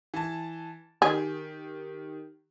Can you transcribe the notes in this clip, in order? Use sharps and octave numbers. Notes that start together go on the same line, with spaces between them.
E3 A5
D#3 G4 G#4